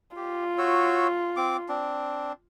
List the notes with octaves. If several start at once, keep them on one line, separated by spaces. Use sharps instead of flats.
F4 G4
F#4 C#5 E6
C4 D6
C4 D4